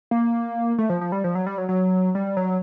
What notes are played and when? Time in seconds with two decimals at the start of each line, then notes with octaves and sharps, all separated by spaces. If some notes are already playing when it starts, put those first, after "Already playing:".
0.11 A#3
0.78 A3
0.90 F3
1.01 F3
1.12 G3
1.24 F3
1.35 F#3
1.46 G3
1.58 F#3
1.69 F#3
2.15 G3
2.37 F#3